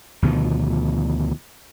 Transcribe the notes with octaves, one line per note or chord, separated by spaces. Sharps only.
D2 B2 D#3 F3